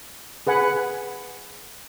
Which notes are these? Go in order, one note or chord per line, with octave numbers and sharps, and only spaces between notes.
G#4 B4 F#5 G#5